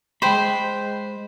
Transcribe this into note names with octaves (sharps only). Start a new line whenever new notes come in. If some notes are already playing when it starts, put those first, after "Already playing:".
G#3 C5 G5 B5